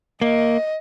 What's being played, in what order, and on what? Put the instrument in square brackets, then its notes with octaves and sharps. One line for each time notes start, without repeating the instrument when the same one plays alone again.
[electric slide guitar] A#3 [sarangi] D#5